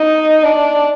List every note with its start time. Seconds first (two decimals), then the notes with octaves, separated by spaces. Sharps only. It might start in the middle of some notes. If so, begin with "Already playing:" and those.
Already playing: D#4
0.43 D4